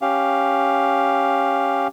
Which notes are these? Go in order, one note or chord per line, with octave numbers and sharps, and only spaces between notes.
C#4 G4 F5